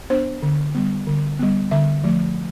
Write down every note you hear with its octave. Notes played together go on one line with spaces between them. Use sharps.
B3 D4 C5
D3
G3 B3
D3
G3 B3
D3 E5
F3 A3